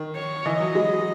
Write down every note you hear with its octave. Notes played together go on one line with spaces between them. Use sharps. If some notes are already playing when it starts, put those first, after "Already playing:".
Already playing: D#3
C#5
E3 D#5
F#3
G#3